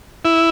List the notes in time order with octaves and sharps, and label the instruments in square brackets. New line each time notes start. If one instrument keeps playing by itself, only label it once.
[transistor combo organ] E4